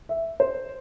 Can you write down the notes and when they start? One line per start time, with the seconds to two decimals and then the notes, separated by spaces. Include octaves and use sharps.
0.09 E5
0.40 C5